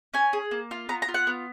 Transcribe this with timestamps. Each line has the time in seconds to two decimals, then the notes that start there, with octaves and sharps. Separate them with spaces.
0.14 C#4 G#5
0.33 G#4
0.51 A#3
0.71 F4
0.89 B3 A#5
1.02 A#5
1.08 F4
1.14 F#5
1.27 B3